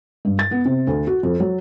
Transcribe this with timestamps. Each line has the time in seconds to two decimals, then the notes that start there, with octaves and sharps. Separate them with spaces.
0.25 G2
0.39 A6
0.51 B3
0.65 C3
0.87 D2
1.07 F#4
1.23 F2
1.40 F#3